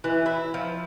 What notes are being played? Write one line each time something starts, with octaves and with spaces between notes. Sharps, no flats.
E3
E4
F3